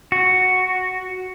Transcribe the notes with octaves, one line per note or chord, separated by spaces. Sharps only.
F#4